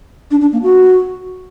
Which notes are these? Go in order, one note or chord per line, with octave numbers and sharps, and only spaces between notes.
D4
D4
A#3
F#4